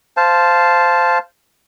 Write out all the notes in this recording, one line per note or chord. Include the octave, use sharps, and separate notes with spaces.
C5 F5 A5